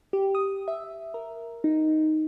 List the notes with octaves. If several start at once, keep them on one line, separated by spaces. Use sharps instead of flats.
G4
D#6
E5
A#4
D#4